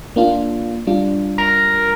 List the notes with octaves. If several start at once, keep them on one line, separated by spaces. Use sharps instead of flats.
A#3 D4 F4
G3 D4 F4
A#4